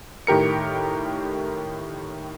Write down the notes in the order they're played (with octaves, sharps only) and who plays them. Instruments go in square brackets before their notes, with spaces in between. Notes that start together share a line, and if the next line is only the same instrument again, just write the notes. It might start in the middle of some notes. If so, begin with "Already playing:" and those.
[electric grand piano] A2 D#3 G4 A#4 C#7